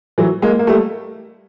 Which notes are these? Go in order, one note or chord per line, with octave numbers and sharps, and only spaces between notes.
E3 F#3
G#3 A#3
A#3
G3 A3